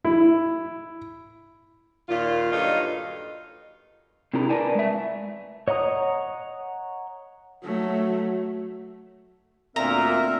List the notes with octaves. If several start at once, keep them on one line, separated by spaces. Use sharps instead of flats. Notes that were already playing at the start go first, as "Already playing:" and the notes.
E4
D#2 A#2 F4
G2 F#3 D#4 F4 A4 D#5
C3 D4 E4 G#4 A#4
A#4 B4 D5 G#5 A5
G#3 E5
C#5 D#5 F#5 A#5 D#6
F#3 A3
D2 A#2 A3 B3 C4 A#4 E5 A#5